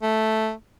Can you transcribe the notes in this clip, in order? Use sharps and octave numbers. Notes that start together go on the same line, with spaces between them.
A3